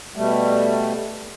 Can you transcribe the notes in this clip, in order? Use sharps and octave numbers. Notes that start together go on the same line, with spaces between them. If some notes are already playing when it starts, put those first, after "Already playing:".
B2 G3 A3